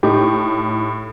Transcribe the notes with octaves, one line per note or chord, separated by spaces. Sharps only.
A2 D#4 G4